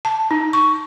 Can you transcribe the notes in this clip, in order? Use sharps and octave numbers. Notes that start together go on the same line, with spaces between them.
A5
D#4
C#6